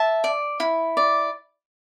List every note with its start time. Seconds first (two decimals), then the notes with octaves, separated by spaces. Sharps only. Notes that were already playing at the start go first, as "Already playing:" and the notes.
Already playing: E5 A5
0.24 D5
0.60 E4
0.97 D5